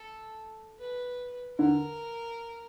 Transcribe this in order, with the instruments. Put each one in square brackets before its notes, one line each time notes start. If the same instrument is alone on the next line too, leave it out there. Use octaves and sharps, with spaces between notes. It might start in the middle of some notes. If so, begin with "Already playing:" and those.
Already playing: [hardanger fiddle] A4
B4
[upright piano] D3 [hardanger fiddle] A#4